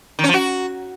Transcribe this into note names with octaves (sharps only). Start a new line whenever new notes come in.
D#3
C#4
F3
F#4